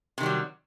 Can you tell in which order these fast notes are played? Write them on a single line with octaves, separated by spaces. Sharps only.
C3 D#3 G3 F#3